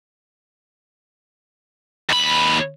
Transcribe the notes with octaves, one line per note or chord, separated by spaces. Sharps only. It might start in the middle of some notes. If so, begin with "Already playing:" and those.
D#2 B5